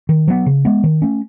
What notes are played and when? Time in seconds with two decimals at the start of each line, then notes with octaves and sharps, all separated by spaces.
0.09 D#3
0.28 F#3 B3
0.46 C#3
0.65 G#3 B3
0.84 D#3
1.02 A3 C#4